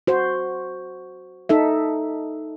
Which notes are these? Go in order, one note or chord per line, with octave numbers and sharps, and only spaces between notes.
F#4 C5
D#4 A4 E5